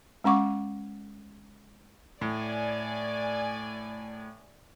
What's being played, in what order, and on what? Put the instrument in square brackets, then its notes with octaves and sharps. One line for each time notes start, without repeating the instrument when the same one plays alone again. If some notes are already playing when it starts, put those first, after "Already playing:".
[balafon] G#3 C#4 F#5 C#6 D6
[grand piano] A2 [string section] D5 G#5